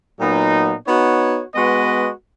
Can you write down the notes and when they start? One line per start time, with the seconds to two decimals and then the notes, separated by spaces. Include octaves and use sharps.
0.19 A#2 F#3 B3 D#4
0.87 B3 D#4 F#4 C#5
1.54 G#3 B3 F#4 B4 D#5